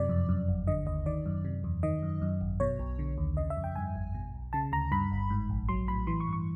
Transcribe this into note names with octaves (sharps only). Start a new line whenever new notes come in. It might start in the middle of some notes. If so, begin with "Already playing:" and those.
Already playing: F#2 C3 D5
F2
F#2
G1
D3 D#5
D#2 D#5
D#3 D5
F#2
C3
E2
D#3 D#5
F#2
F#2
G#1
B2 C#5
B1
D3
D#2
C#3 D#5
E5
F2
G5
G2 G#5
G#1
B2
B1
C#3 A5
D2 A#5
G2 B5
G1
G#2
A#1
F#3 C6
A2 B5
E3 C6
C#6
G2
C#6